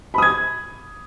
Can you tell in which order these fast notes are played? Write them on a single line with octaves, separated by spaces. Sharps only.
B5 D#6 G#6